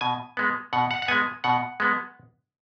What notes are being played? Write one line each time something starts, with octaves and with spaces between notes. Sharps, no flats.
B2 G#5
G#3 B3
B2 F#5
F#5
F#5
G#3 B3 G#5
B2 F#5
G#3 B3